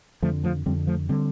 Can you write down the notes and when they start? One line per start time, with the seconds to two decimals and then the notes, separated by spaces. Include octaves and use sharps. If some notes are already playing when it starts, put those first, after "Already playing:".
0.22 F2 D3 F3 A3
0.44 F3 A3
0.66 F2 D3 G3 C4
0.87 F3 A3
1.09 D3 G3 C4